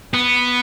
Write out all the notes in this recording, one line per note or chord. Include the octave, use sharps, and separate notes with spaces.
B3